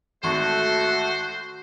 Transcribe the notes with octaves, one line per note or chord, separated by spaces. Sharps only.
G#1 A3 F#4 A4 C5 C#6